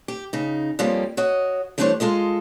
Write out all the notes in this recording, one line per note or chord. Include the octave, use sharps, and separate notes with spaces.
G4
C#3 D#4
F2 F3 G3 A#3 C#4
F#4 C#5 D#5
E3 G3 A3 D4 C5 C#5
G#3 F4 A4 D#5